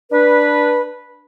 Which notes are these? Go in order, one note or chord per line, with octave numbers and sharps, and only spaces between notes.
D4 B4